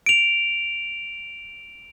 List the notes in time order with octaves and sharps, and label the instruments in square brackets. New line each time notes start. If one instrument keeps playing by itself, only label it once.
[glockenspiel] D7 F7